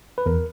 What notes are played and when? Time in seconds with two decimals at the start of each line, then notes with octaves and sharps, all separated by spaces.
0.18 B4
0.26 E2 A#4